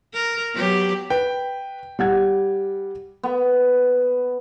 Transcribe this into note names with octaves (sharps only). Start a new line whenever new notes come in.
A#4
F#3 B3 G4
B4 G5
G3 F#5 G#6
B3